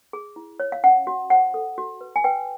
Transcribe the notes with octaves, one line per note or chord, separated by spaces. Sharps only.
G#4
E4
C#5
F5
C#4 F#5
F#4
C5 F#5
A4
F#4
B4
G#5
B4 G5